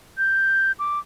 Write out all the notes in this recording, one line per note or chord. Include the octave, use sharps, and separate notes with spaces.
G6
D6